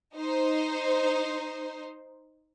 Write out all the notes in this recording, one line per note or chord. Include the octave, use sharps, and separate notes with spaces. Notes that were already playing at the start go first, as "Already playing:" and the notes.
D#4 C5